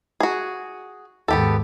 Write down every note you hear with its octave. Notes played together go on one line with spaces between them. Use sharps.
F#4 G#4
D#2 G#2 B3 G4 A4